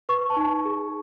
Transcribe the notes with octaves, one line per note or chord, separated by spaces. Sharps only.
B4 C#6
A5
D#4
G#4